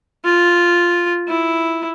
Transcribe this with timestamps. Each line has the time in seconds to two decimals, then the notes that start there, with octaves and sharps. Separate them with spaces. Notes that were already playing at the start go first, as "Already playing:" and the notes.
0.25 F4
1.28 E4